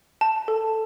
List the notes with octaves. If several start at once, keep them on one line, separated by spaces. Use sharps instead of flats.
A5
A4